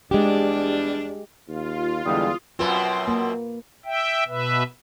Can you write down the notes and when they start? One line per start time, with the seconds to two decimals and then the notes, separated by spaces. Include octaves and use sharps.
0.11 E2 G3 G#3 D4 G4
1.48 D#2 F4
2.06 E2 D3 G3 G#3 D#6
2.59 F#2 B2 C4 F4 B4
3.08 A#3
3.85 E5 G5
4.28 B2 B4 E5